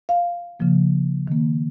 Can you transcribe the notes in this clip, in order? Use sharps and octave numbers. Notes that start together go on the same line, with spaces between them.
F5
C#3 F3 A#3
D#3 A#3